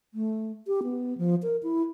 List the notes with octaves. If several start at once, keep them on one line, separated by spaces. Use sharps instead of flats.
A3
G4
B3
F3
A#4
E4